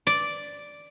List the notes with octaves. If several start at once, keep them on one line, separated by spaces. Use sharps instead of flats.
D5